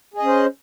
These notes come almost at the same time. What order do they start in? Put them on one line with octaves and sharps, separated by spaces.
G#4 D#5 C#4 C5